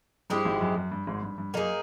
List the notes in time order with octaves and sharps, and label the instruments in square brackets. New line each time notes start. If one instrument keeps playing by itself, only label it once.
[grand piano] G2 [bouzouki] G#3 C4 E4 G4
[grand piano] G#1 G#2
F#2
F#2
G2
G#1 G#2
G2
G2
[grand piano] F#2 [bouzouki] A#3 D#4 G#4